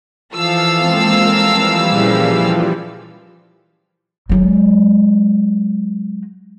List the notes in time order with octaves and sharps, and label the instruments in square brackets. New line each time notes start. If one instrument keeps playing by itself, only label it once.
[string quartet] E3 F3 A4 [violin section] F5 E6
[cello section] G#3 C4 [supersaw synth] A#3
[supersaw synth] E3 F3 G3 [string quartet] A4 A#4
[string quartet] A#2 C#3 [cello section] A#3
[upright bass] F#3 G#3